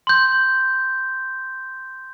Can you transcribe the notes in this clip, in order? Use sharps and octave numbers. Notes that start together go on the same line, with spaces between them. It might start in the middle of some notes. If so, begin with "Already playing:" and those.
C6 G6